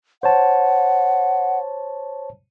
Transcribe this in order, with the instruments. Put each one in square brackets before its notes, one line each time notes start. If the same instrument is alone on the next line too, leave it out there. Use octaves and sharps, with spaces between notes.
[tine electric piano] C5 C#5 A5 [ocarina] F#5